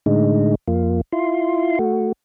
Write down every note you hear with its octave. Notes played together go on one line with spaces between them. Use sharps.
A2 D3 G#3 D#4
F2 A#3 F4
E4 F4 C6
A3 F#4